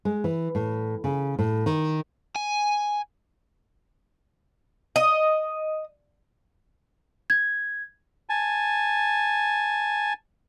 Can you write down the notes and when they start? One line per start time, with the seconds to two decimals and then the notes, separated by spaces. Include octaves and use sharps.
0.05 G#3
0.24 E3
0.55 A2
1.04 C#3
1.39 A2
1.66 D#3
2.36 G#5
4.96 D#5
7.30 G#6
8.29 G#5 A5